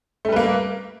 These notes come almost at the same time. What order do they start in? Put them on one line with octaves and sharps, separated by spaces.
A3 G3 B4 A#3